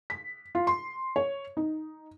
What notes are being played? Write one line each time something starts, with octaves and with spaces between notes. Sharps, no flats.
B6
F4
C6
C#5
D#4